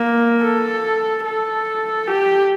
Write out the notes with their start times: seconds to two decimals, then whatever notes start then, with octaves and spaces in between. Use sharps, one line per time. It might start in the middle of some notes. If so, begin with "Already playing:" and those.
Already playing: A#3
0.43 A4
1.25 A4
2.08 G4